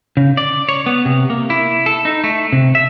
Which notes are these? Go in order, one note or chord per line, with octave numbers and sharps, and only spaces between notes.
C#3
D5
C#5
B3
C3
A#3
E4
A4
D#4
A3
C3
E5